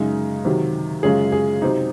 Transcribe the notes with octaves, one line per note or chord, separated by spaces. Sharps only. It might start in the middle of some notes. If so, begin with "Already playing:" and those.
Already playing: F#2 C#3 G#3 D#4
C3 D#3 F#3
F#2 C#3 G#3 C#4 F4 G#4
G#4
C3 F#3 C4 D#4